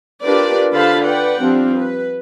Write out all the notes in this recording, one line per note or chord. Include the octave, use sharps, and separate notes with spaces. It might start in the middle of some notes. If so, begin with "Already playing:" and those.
D4 F4 G4 A#4 B4 D5
D3 F4 C5 F5 A5 B5
B4 D5 F#5 G5
F3 G3 C4 D4
B4